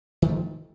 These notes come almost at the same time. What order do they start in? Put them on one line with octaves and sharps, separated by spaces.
D#3 A3 F3